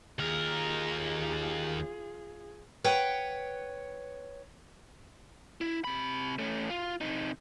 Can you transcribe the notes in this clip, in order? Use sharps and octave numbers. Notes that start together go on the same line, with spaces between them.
D#2 F4 G#4 A#4
B4 C#5 F#5 G5
E4
C3 B5
A3 C#4
F4
C3 D#4